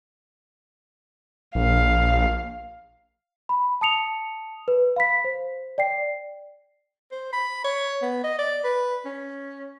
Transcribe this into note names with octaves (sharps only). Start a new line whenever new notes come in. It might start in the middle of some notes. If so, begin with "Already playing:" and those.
A#1 F5
B5
A5 D#6 C#7 F7
B4
F5 B5 B6
C5
D5 G5 C7
C5
B5
C#5
B3
D#5
D5
B4
C#4